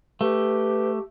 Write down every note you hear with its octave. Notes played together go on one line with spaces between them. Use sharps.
A3 G4 B4